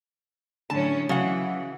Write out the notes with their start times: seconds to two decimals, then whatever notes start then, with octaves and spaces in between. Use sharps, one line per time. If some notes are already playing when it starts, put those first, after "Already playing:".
0.70 A2 D3 F#3 C#4 A5
1.09 C#3 E3 F#3 F#5